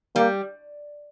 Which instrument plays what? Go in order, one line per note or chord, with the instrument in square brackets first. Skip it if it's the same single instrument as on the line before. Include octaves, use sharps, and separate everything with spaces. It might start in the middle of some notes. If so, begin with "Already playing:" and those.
[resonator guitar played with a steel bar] G3 [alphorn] A#3